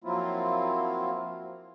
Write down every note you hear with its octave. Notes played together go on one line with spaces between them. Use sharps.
F3 F#3 A#3 C4 E4 F4